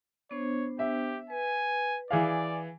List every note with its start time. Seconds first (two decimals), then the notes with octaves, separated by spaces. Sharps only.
0.31 B3 D4 C5 C#5
0.79 G4 E5
1.30 B4 G#5
2.11 E3 G#4 D5 F5